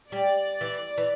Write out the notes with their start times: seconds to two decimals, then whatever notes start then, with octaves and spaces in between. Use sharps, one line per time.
0.12 G3 D5
0.61 E3
0.98 E3